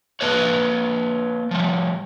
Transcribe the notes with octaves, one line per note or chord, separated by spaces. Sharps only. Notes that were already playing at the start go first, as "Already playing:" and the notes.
A#3 B4 C#5
F3 G3